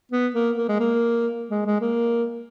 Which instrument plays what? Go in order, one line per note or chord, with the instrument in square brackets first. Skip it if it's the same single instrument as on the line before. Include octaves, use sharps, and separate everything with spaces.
[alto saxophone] B3
A#3
A#3
G#3
A#3
G#3
G#3
A#3